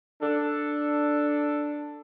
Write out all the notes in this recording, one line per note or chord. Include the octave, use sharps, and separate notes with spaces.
D4 A4